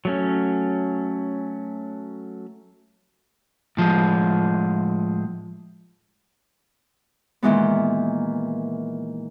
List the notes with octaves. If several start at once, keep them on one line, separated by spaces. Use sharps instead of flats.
F#3 A3 C#4
A2 F3 G#3
A#2 D#3 E3 G#3 B3